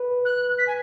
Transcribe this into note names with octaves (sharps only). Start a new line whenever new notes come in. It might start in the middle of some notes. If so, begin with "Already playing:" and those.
Already playing: B4
F#6
B6
G#5